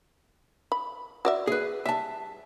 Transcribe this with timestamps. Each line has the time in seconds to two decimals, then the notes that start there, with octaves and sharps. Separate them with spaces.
0.72 B5
1.25 F#4 D5 E5
1.47 G#4 B4
1.86 G3 E5 A5